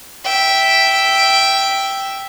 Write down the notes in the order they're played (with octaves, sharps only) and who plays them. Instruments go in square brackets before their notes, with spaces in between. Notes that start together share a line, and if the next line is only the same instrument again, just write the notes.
[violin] E5 G5